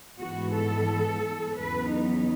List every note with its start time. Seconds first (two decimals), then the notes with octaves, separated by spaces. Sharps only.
0.20 G#2 E3 G#3 B3 F#4
0.54 A4
1.58 E2 C#3 F#3 B3 B4
1.93 D#4